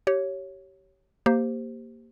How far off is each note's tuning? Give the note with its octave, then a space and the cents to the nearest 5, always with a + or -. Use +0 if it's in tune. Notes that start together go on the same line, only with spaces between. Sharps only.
G4 -25 C#5 +0
A#3 +0 G4 +0 C5 +0